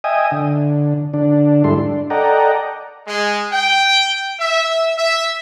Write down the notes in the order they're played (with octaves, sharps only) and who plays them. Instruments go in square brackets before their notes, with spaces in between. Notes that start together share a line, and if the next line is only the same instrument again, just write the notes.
[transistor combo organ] D#5 E5 G5 G#5 D#6
D3
D3 D4
G#2 G3 E4 A4 C6
D4
A4 D5 D#5 F#5 G5 A#5
[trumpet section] G#3
G5
E5
E5